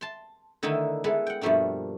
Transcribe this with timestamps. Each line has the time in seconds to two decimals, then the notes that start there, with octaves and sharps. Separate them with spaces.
0.01 A5 C6
0.63 D3 D#3 A3 D#4 E4
1.04 G#3 B3 E4 A4 B4
1.27 F#5 G5
1.41 G2 B2 F3 A3 A#3 D4